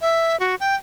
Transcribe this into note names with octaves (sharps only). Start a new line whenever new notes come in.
E5
F#4
G5